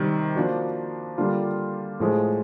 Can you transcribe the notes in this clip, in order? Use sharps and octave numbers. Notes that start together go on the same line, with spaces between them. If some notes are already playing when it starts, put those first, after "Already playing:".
Already playing: C3 D#3 G3 C4
F3 A#3 D4 F#4
D3 G3 A#3 D4 F4
A2 F3 G#3